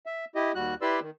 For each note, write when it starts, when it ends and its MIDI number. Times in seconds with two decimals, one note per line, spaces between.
0.06 0.25 76
0.35 0.52 64
0.35 0.52 67
0.35 0.52 75
0.55 0.74 39
0.55 0.74 55
0.55 0.74 66
0.55 0.74 90
0.82 1.00 64
0.82 1.00 67
0.82 1.00 71
0.82 1.00 74
0.82 1.00 84
0.82 1.00 88
1.01 1.10 51